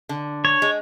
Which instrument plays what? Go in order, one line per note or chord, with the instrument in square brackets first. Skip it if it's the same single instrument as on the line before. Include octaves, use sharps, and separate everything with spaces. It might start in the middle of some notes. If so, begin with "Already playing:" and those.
[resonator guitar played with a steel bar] D3
[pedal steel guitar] C#5
[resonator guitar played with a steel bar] G#3